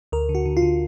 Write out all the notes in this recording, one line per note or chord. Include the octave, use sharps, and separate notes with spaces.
D2 A#4
D3
F#4
D3
F4
D3